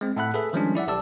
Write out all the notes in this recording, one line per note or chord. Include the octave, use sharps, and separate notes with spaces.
G#3 C4
A2 A3 E5 F#5 B5 F#6
G#4 A4 B4 E5
D#3 F3 G3 G#3 C#4 D4
E4 D5 E5 F#5
B1 G4 D5 A5 E6